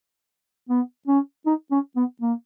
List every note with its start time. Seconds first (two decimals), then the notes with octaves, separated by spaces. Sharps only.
0.69 B3
1.07 C#4
1.46 D#4
1.71 C#4
1.96 B3
2.22 A#3